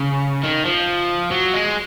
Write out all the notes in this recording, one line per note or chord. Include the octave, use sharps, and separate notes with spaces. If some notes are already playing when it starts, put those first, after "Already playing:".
Already playing: C#3
D#3
F3
F#3
G#3